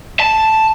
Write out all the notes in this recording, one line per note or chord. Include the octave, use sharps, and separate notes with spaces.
A5